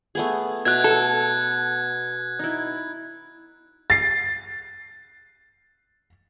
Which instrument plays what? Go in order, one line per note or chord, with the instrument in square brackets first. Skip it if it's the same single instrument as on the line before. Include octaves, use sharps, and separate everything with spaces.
[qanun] A3 B3 G#4
[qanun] B2 E5 [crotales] F#6 G#6
[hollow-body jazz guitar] A4
[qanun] D#4 E4
[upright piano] A6 C7